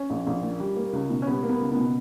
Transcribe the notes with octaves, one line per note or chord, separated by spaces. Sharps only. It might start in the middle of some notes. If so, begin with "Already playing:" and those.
Already playing: C#4
A#1
A#1
A#2
G3
A#3
C#2
B2
C#4
G3 B3
A#3
B3
C#2
B3
B2